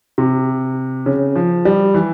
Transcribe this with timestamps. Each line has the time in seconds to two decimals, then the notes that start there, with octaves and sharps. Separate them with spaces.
0.18 C3
1.06 C#3
1.36 F3
1.65 G3
1.94 E3